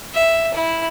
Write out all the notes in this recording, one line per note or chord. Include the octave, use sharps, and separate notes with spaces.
E5
E4